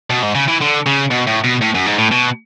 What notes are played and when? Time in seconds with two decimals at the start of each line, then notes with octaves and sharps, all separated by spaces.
0.10 B2
0.22 G#2
0.35 C#3
0.48 E3
0.61 D3
0.86 C#3
1.11 B2
1.27 A2
1.44 B2
1.61 A2
1.74 F#2
1.86 G#2
1.98 A2
2.11 B2